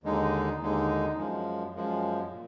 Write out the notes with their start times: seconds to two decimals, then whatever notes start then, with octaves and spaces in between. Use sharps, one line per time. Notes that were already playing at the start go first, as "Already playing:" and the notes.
0.04 D#2 D3 G#3 D#4
0.61 D#2 D3 G#3 D#4
1.18 F#2 F3 G#3
1.75 F#2 F3 G#3
2.32 A#2